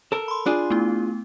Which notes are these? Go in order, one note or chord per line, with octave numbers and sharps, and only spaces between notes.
A4 A#4
B5 C6
D4 F4 G#4
A3 B3 E4